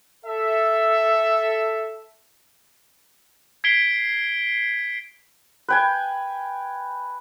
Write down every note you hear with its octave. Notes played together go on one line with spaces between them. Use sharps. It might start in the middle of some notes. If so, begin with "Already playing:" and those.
A4 E5
G#6 B6 C7 D7 G7
B4 G5 G#5